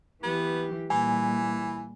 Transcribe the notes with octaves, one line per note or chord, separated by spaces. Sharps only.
E3 B3 G4
A#2 E3 G3 G#5